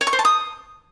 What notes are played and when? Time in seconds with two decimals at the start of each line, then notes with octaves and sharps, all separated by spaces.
0.01 C#5
0.07 C#6
0.13 C5
0.19 A5
0.25 D#6